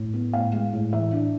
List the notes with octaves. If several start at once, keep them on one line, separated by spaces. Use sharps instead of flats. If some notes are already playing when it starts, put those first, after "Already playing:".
Already playing: A2
B3
A2 F5
G#3
A2
E3 E5
D4